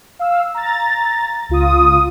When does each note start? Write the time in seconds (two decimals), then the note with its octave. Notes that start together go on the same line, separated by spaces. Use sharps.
0.19 F5 E6
0.54 A#5 A6
1.49 C#2 F4 D#6